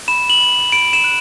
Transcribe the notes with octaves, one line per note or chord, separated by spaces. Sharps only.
B5 E7
F#7
B5
B5 D7
E7
F#6